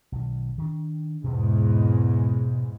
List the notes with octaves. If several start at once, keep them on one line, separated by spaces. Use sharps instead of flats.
B1 D#3
D#3 D4
E2 G#2 B2 G#3